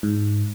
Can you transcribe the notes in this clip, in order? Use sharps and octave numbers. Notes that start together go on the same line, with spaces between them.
G#2